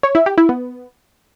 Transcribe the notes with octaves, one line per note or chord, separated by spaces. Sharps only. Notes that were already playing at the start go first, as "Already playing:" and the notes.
C#5
E4
G4
E4
B3